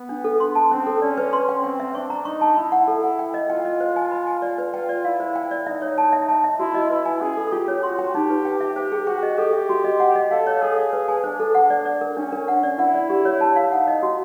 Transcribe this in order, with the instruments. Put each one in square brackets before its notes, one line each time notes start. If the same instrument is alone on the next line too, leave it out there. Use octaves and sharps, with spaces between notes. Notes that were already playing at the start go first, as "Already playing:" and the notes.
Already playing: [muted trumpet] B3
[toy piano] D4
A4
C6
A5
[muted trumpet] C4 [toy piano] C#4
[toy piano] A4
[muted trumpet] C#4 [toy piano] D5
[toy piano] B4
C6
G5
[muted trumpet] C4 [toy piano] G5
[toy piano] E5
[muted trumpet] D4 [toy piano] C#6
[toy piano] A#5
[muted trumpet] D#4 [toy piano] C#6
[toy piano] A5
[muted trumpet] E4 [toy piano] B5
[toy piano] F#5
A4
F#5
G5
D#5
[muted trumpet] F4 [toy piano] G5
[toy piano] D#5
C5
G#5
B5
G#5
D5
B4
[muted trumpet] F4 [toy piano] G5
[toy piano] D5
[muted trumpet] E4 [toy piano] F5
[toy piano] C5
G5
D5
[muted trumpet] D#4 [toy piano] E5
[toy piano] C#5
A5
E5
A5
E5
[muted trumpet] E4 [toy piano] F#4
[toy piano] D#5
[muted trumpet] E4 [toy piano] B4
[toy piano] G#5
[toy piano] C#4 [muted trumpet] G#4
[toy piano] A4
[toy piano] F4 [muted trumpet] G4
[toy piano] C#5
[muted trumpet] F#4 [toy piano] C6
[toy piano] G5
[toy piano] D#4 [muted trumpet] G4
[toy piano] B4
G5
E5
[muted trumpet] G4 [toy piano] C5
[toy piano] G#4
[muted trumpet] F#4 [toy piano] G5
[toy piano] D#5
[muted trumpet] G4 [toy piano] A4
[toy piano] E5
F#4
D#5
F#5
D#5
[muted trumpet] A4 [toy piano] F5
[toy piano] C#5
[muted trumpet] G#4 [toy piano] A4
[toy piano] F5
B4
G#5
[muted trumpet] D4 [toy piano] C5
[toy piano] A4
F#5
D5
D5
A#4
[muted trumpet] C#4 [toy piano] D4
[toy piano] A#4
F#5
D5
[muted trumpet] E4 [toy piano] F#5
[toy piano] D5
G4
C#5
A5
F5
[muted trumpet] D#4 [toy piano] F#5
[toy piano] D#5
F#4